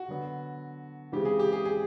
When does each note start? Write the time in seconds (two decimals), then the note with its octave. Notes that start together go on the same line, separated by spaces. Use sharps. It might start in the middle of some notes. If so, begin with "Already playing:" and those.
Already playing: F#4
0.08 D3 F#3 B3
1.12 C#3 E3 G#3 C4 G4
1.25 G#4
1.39 G4
1.52 G#4
1.65 G#4